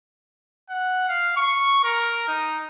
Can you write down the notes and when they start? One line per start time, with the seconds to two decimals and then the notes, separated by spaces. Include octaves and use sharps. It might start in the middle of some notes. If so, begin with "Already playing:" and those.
0.69 F#5
1.08 F5
1.37 C#6
1.84 A#4
2.28 D#4